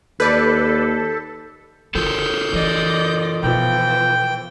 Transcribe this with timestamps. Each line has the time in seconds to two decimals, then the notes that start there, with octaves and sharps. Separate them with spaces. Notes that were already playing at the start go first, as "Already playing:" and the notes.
0.20 D#2 A4 B4 D5 G6 B6
1.95 D3 F4 A4 A#4 G6
2.53 E3 D5 D#5
3.43 B2 E3 F3 G5